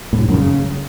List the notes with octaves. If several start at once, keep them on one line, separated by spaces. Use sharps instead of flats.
A2
G#2
A2
F#2
C#3